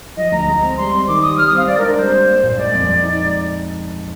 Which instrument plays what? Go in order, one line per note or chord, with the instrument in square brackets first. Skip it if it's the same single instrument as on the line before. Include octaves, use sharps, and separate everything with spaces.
[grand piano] F3 [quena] D#5
[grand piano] D2 [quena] A#5
[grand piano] G#3
C4
[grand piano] G3 [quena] C6
[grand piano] C4
[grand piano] D#3 [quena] D6
[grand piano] G3 [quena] D#6
[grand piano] G3 [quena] F6
[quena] D#6
[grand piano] C4 [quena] F5
[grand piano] G#3 [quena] D5
[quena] A#4
[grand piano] D4
[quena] A#4
[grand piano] G3 [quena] C5
[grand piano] A#3
A#3
A#2
[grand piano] G#3 [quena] D5
[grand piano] F2
G#3
D#4